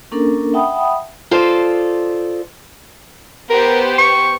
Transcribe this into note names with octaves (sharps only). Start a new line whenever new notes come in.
A#3 C#4 D4 A4 A#4
E5 F#5 G5 A5 B5 D#6
F4 A4 C5 D5 D#5
B3 G4 A#4 C5
C#6